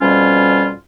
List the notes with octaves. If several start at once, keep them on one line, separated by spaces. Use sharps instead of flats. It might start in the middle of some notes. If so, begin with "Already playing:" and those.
F2 B2 G3 C#4 F4